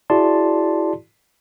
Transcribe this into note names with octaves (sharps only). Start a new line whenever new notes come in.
E4 F#4 G#4 D5 A5 C6